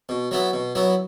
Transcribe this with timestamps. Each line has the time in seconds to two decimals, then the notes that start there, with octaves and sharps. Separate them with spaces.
0.09 B2
0.31 F#3 B3 E4
0.53 B2
0.75 F#3 B3 E4